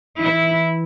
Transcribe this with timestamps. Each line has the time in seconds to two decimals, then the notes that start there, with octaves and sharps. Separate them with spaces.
0.20 E3 E4